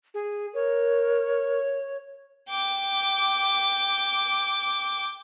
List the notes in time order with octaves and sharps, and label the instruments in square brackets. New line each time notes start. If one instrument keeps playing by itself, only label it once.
[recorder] G#4
[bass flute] A#4 [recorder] C#5
[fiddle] G5 D6